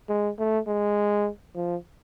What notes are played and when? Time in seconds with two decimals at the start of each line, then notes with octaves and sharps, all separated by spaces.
0.09 G#3
0.39 A3
0.67 G#3
1.55 F3